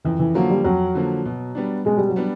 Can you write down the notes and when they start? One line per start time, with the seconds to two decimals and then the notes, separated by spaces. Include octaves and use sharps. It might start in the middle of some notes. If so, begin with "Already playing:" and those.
0.04 F2 E3
0.19 E3
0.34 D3 F3 F#3 A#3
0.50 G3
0.64 F2 F#3
0.95 D3 F3 A#3
1.26 B2
1.55 G3 B3 D4
1.85 B2 G#3
1.98 G3
2.09 F#3
2.16 G3 B3 D4